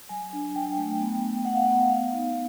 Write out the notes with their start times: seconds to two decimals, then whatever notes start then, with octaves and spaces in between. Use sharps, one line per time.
0.09 F#3 G#5
0.33 D4
0.55 F#3 G5
0.78 A3
1.00 B3
1.23 B3
1.45 B3 F#5
1.54 F5
1.62 B3 F#5
1.90 B3 F5
2.12 D#4